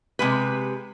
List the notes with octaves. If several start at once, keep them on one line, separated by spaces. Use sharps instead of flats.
C3 G#3 B4